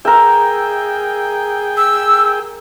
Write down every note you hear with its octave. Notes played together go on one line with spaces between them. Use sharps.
G#4 A#4 E5 G5
E6